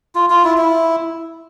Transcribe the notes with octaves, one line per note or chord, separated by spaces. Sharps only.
F4
F4
E4
E4